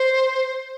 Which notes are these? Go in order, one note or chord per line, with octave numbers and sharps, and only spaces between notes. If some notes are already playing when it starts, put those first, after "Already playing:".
Already playing: C5